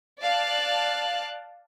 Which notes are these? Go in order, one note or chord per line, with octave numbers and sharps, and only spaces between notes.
D5 F5 A5 F#6